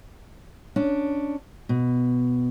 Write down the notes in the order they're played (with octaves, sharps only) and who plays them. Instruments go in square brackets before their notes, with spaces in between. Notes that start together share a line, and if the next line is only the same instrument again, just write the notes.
[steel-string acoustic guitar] C#4 D4
B2